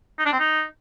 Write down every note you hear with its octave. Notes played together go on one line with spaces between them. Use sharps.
D#4
D4
C4
D#4